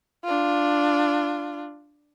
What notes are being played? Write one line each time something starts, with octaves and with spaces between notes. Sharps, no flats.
D4 F4